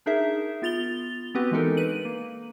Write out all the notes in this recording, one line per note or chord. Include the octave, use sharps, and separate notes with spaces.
D4 D#4 G#4 A#4 E5
B3 F4 A6 F7 G7
B3 C4 F#4 G4 B4
E3 G#3 D4 D#4 A4 A#4
B4 D#7 F#7
A#3